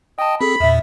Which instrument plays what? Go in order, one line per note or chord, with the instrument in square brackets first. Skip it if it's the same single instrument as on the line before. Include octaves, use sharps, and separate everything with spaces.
[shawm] D#5 [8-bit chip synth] G5 A5
[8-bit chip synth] C4 G#4 A4 [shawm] B5
[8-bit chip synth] E2 A#2 [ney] E5